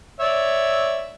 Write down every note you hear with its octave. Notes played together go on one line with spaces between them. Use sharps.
C#5 D5 E5